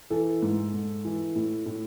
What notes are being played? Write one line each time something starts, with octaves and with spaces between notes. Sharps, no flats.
E3 A4
G#2
G#2
E3
A2
A2